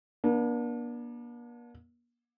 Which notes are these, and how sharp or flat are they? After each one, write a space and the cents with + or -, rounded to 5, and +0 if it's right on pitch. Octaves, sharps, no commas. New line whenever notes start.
A#3 +45 D4 +0